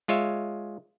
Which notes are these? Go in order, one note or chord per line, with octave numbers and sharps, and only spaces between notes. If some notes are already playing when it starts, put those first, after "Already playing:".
G#3 F4 C#5 E5